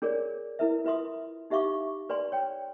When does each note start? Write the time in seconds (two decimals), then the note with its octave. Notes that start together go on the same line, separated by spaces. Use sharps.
0.02 D4 G#4 A#4 C#5 D5
0.59 E4 A#4 B4 E5
0.85 F4 B4 E5 C6 D#6
1.50 D#4 G4 E5 F5 C#6 D6
2.09 B4 D5 G#5 C6
2.32 C#5 G5